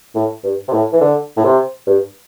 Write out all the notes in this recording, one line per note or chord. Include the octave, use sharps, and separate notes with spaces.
A2
G2
C3
A2
E3
D3
A2
C3
G2